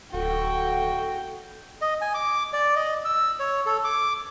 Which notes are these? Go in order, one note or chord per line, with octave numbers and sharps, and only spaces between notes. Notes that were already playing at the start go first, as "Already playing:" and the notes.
D1 F#4 A4 G5
D#5
G#5
D6
D5
D#5
E6
C#5
A4
D6